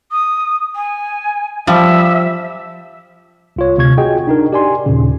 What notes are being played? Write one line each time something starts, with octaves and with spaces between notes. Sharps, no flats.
D#6
G#5
F3 G3 E5
C2 F4 C#5
D2 C3 C#6 G#6
F4 F#4 G#4 D#5 G5
D4 D#4 A#4
G4 D5 G#5 C6
D#2 A#2 C#3